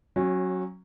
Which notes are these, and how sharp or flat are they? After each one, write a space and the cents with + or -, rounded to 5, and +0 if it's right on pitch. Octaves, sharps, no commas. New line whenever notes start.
F#3 +0 C#4 -25